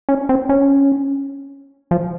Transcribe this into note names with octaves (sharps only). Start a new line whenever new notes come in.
C#4
C4
C#4
F3